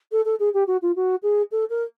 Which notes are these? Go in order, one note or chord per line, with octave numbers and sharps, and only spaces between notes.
A4
A4
G#4
G4
F#4
F4
F#4
G#4
A4
A#4